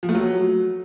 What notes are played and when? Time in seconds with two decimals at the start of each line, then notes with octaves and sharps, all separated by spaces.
0.03 F3
0.09 A3
0.15 F#3